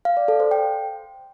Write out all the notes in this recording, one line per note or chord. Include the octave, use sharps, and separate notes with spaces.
F5
D5
A4
C5
G5